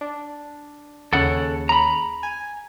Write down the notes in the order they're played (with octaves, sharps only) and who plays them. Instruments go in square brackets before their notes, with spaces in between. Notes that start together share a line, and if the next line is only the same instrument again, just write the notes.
[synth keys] D4
[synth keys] D#2 C#3 [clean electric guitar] A4 F#5
[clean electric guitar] A#5 B5
[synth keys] G#5